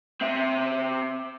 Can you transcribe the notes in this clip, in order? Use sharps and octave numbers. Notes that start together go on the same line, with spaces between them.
C4 E5